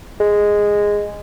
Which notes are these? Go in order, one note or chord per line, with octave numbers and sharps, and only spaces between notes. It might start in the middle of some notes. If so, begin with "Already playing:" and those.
G#3